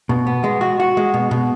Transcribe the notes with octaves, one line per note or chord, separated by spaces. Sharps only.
B2
B3
G#3
F#4
F#4
G#3
B2
B2